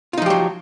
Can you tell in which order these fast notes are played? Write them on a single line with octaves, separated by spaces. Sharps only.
F4 D#4 F3 G4 F#3